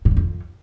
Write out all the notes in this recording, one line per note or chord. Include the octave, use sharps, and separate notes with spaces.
A#2
G2
F2